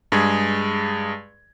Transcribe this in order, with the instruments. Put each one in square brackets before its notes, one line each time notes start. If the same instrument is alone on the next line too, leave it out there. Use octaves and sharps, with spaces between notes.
[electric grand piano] G2 G#3 G#4 G#6